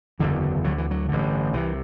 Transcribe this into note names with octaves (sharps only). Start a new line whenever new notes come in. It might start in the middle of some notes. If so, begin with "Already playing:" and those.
F#1 E2 D3 E3
D2 D3 F#3
E3
F#3
A1 G2 D3
C2 C3 E3